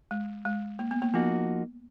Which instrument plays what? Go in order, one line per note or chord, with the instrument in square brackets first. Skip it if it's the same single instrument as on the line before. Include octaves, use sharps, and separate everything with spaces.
[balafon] G#3
G#3
A#3
B3
A#3
[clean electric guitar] F3 A#3 D#4 F#4 [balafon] B3